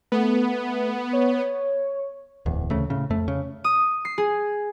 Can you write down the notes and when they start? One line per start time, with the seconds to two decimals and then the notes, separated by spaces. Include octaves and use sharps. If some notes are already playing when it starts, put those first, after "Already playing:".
0.12 A3 B3
1.13 C#5
2.46 D1 E2
2.70 D2 C#3 A3
2.90 A2 C#3
3.10 F2 A3
3.28 C#3
3.64 D#6
4.05 C7
4.18 G#4